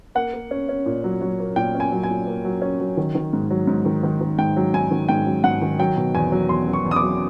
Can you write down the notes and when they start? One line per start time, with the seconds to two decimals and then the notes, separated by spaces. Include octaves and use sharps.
0.15 A#3 F#5
0.33 A#3
0.51 C#4
0.69 C#4
0.86 A#2
1.04 F#3
1.21 F#3
1.39 A#3
1.56 A#2 G5
1.75 C#4
1.80 G#5
1.92 F#3
2.03 G#5
2.09 A#2
2.27 A#3
2.45 F#3
2.62 C#4
2.80 F#3
2.97 D#3
3.15 D#3
3.33 G#2
3.50 F#3
3.67 G#2
3.85 D#3
4.03 D#3
4.21 D#3
4.38 G#2 G5
4.56 F#3
4.74 G#2 G#5
4.91 D#3
5.09 G#2 G5
5.26 F#3
5.44 G#2 F#5
5.62 D#3
5.79 F#3 G5
5.96 B2
6.15 E2 G#5
6.32 F#3
6.49 E2 C6
6.67 F#3
6.73 C#6
6.85 E2
6.91 D#6
6.96 D6
7.02 F#3